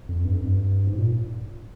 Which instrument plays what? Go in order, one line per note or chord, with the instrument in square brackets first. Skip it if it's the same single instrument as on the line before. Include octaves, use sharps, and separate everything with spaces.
[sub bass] F2
G2
F2
G2
G#2
A#2